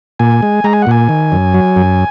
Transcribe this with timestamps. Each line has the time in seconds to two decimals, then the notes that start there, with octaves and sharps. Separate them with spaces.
0.19 A#2 G#5
0.42 G#3
0.64 G#3 A#5
0.73 G#5
0.82 F#5
0.87 A#2 G#5
1.09 D#3
1.32 F#2
1.54 F#3
1.76 F#2